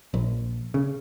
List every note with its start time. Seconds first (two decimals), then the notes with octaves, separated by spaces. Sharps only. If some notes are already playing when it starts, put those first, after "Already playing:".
0.14 A#1
0.74 C#3